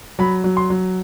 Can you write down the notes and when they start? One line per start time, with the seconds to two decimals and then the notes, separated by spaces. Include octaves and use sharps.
0.19 F#3 B5
0.44 F#3
0.57 C6
0.70 F#3